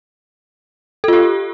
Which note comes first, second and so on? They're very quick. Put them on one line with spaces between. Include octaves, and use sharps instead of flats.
A4 F4 G4